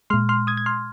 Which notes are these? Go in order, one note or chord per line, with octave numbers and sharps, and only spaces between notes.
A#2 G#3 C6 F6
C6 F6
D#6 G#6
G#6
C6 F6